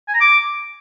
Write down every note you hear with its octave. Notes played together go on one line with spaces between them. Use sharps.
G#5
A#5
D6